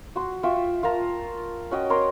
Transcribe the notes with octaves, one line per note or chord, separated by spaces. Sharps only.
F#4 C6
F4 E5 G5 C#6
F4 A#4 A5 A#5
C#4 F#4 D#5 G5
A#4 C#5 A#5 C6